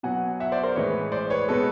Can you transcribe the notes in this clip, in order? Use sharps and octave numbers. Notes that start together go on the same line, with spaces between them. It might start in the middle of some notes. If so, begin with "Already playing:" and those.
B2 F#3 F#5 G#5
E5 F#5
C5 D5
A#4 C5
A2 E3 G#3 B4 C#5
C5 D5
B4 C#5
B2 G#3 A4 B4